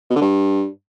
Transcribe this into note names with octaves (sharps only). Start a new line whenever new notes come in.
B2
D3
G2